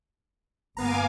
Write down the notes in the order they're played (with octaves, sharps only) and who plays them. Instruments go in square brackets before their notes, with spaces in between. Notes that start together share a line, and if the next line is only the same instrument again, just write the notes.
[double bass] G1 A#3 [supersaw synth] B3 A#5 [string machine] F5 G#5 D6